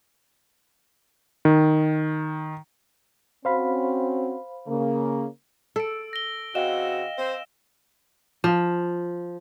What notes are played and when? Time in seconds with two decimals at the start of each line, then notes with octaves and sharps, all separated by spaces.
1.45 D#3
3.45 C4 C#4 F#4 C5 F5 B5
4.68 C#3 A#3
5.76 A4 E6 D7
6.13 A#6 G7
6.55 C#3 C4 F#4 D#5 F5 G5 E7
7.19 C4 C5
8.44 F3